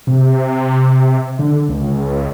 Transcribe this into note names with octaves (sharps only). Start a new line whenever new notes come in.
C3
D3
C#2